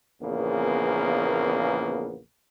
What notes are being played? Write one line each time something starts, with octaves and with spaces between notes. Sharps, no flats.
A#1 E2 C#3 A#3 B3